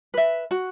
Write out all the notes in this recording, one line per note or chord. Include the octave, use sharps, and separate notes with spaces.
B4 E5
F#4